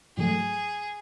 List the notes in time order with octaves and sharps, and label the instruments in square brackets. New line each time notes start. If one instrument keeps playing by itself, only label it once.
[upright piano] G#2 F#3 A3 [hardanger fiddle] G#4